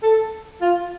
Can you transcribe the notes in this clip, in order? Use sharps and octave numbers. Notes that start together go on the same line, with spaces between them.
A4
F4